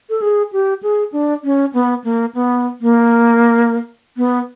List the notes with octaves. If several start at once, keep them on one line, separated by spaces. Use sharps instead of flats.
A4
G#4
G4
G#4
D4
C#4
B3
A#3
B3
A#3
B3